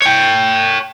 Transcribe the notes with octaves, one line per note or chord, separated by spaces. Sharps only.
C#5 G5